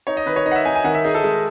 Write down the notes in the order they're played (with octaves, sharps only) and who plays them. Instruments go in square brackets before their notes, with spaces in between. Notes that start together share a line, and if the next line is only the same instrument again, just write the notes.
[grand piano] D#4 C#5
D#5
D#3 B4
C#5
D#4 D#5
F#5
E5
D#4 G#5
G#5
D#3 F#5
E5
D#4 G#4
A4
G#3